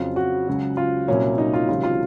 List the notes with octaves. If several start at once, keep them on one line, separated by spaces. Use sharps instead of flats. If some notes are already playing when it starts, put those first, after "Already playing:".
Already playing: F2 C#3 F#3 F4
F#4
C#2 C#3 F#3
F4
C2 A#2 F#3 C#4
D#4
F4
C#2 C3 D#3 F#3 F4
F4